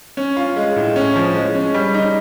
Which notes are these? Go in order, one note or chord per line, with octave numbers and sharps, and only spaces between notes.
C#4
F4
G#3
A2
C#4
F3
G#3
C#4
G3
D#4